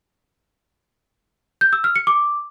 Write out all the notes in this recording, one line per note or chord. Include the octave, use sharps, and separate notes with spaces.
G6
E6
F6
C#7
D6